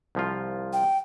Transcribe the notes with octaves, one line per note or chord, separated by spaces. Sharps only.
C2 F3 F4
G5